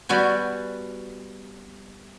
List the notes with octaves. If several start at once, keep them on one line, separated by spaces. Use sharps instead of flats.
G3 B3 F#4 G#5